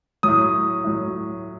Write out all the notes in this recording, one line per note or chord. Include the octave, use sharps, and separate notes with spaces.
A2 F#3 D#6
A2 F#3